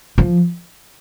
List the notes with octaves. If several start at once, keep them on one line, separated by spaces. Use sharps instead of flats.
F3